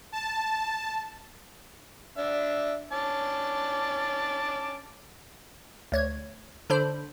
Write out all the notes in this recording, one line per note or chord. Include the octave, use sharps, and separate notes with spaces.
A5
D4 E5
C#4 A5 D6
D2 C#5 G#6
D3 D4 C5 B5